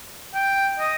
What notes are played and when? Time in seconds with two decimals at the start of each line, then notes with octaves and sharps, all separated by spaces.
0.34 G5
0.79 D#5